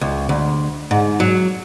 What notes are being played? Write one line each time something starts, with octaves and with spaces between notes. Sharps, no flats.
C#2
D2
G#2
F#3